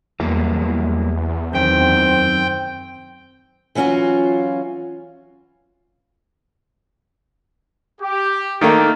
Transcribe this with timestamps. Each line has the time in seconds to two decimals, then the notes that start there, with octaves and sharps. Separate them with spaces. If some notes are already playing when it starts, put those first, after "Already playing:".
0.20 E2 F#3 G3 A#3
1.54 F#2 D#3 C4 G5
3.75 E3 F#3 C#4 F4 F#4
8.01 G4
8.61 D#3 A3 A#3